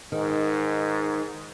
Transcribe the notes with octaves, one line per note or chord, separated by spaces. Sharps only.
G#2 D#3